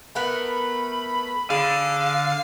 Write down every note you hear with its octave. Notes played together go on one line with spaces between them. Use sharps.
A3 B3 A#4 B5
D3 G#4 F5